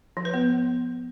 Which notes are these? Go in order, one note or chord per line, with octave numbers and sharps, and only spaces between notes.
F3
B4
B3